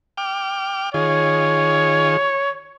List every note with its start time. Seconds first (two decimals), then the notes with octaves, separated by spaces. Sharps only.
0.17 G5 D6 F6
0.94 D#3 F4 G#4 C#5